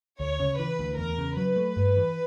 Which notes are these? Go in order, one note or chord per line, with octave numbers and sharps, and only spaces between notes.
D2 C#5
C#3
E3 B4
D2
E2 A#4
C#3
F#3 B4
A3
G2
E3